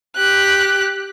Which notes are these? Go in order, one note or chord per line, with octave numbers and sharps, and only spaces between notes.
G4 F#6